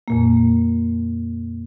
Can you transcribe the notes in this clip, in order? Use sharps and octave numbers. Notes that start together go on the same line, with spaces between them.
F2 A#2 A#3